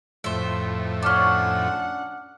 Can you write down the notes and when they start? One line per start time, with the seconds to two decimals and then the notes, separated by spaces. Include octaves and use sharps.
0.24 F2 A2 C5 E5
1.03 C#4 D4 F#5 D6 F6